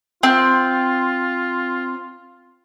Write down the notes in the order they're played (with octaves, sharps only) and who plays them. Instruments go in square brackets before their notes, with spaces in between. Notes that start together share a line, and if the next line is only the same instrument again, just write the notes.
[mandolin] C4 [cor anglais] F4